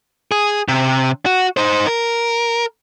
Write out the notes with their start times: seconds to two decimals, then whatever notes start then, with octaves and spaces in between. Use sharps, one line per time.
0.32 G#4
0.68 C3
1.26 F#4
1.57 D#4 C5
1.87 A#4